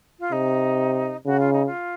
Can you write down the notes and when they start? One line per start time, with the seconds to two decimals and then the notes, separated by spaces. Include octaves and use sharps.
0.19 F4
0.32 C3 D#4
1.26 C#3 F#4
1.39 F4
1.53 D#4
1.66 F4